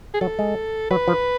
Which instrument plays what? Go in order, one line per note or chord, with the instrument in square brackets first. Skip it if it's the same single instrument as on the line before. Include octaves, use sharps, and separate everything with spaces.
[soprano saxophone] G#4
[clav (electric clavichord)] F#3 [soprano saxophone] A4
[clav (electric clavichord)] G#3
[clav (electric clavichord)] F#3 [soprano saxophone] B4
[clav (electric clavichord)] F3